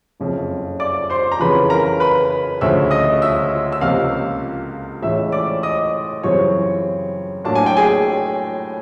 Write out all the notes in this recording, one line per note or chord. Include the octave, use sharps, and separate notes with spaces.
F#1 F2 C#3
D5 D6
C5 C6
A#5
F2 C#3 E3 B4 B5
A#4 A#5
B4 B5
D2 C#3 F3 E5 E6
D#5 D#6
E5 E6
E6
C#2 C3 F3 A#3 F5 F6
A2 E3 G#3 C#4 E5 E6
D5 D6
D#5 D#6
F#2 C#3 E3 G3 C4 C#5 C#6
A2 F#3 A#3 D4 A5
G#5
G5
G#4 G#5